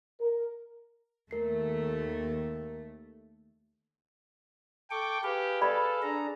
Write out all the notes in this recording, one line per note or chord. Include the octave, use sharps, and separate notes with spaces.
A#4
D#2 A3 A#4 C7
A4 G5 C#6 D6
G4 G#4 B4 F5
A4 D5 B5
D4 G#4 A#5